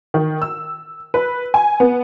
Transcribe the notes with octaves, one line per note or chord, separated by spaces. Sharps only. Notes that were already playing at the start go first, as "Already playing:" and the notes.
D#3
E6
B4
G#5
B3